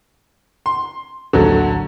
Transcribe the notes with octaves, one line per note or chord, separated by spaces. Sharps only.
C6
A#1 D#2 A2 D3 F#3 A3